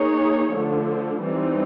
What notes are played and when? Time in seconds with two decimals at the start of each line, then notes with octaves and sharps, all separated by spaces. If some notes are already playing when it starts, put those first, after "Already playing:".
Already playing: A#3 D#4 G#4 C#5
0.51 D3 F3 A3
1.22 E3 G3 C4 D#4